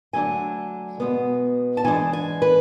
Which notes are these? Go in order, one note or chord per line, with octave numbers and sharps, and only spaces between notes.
D3 F#3 A3 D4 G#5
B2 G#3 B3
A5
E3 G#3 D4 G#5
G#5
B4